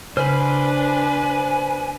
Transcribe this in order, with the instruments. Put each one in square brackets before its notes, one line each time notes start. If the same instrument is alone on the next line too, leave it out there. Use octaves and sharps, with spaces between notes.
[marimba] C#3 [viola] D4 B4 [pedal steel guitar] C5 B5 [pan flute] G#5